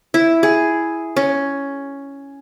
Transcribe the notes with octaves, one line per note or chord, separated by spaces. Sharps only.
E4
G#4
C#4